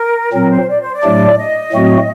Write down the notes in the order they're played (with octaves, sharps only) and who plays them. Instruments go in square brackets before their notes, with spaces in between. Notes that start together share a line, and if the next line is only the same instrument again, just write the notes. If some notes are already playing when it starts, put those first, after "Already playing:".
Already playing: [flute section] A#4
[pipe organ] A#2 F#3 C4 [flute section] A#4
[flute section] C5
D5
C5
D5
[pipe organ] A2 F#3 A3 D4 G4
[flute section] D#5
[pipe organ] A2 F#3 A3 C4 F#4